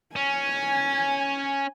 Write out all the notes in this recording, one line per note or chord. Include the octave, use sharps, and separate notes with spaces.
C#4 G#5